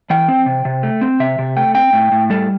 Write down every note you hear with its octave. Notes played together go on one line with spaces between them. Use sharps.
E3 G5
C4
C3
C3
A3
C4
C3 E5
C3
A3 G5
C4 G5
A2
A2
G3 A4